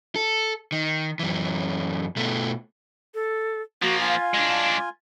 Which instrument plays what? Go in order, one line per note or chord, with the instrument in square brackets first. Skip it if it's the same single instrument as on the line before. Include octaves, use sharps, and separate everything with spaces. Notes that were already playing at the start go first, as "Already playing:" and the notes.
[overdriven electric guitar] A4
D#3
F#2 E3
B2 A3
[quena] A4
[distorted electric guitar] F3 A#3 [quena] F#4
[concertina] F4 G#5 [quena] F5
[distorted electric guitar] G#3 D4